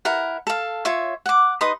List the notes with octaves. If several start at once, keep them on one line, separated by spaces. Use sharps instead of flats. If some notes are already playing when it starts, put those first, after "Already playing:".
E4 A#4 F#5
A4 F5
F4 C#5 E5 C#6
F#5 D6
D#4 B4 C6 D#6